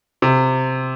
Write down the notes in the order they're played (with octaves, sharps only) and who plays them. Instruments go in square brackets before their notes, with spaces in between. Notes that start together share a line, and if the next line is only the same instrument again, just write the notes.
[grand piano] C3